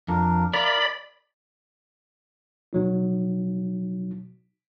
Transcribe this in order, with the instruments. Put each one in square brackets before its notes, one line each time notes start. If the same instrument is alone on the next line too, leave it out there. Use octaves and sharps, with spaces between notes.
[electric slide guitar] F2 [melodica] D4 A#4
[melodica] E4 F5 [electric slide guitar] A#4 [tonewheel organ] D5 B5
[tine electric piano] B2 F#3 D#4